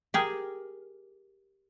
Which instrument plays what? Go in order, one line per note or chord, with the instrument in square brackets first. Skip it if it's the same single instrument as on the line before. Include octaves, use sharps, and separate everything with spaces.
[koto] G4 G#4 A#4